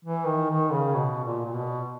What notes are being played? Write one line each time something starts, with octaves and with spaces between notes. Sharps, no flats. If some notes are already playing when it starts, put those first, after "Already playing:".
E3
D#3
D#3
C#3
B2
A#2
A#2
B2